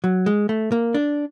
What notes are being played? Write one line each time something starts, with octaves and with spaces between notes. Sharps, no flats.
F#3
G#3
A3
A#3
D4